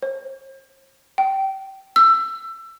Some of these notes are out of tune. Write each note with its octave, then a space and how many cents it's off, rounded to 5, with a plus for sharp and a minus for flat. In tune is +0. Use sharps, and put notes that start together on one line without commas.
C5 +40
G5 -20
E6 +20